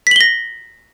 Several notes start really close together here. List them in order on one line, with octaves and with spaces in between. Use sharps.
B6 F#7 G7 A#6